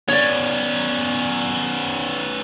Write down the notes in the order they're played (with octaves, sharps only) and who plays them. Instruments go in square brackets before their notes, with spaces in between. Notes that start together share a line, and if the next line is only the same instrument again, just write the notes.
[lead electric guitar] B3 C#4 [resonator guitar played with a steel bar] C#5 D5